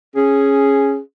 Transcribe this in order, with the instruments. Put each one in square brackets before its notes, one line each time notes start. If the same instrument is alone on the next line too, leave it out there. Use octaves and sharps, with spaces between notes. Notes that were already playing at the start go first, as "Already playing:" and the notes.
[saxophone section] C#4 G#4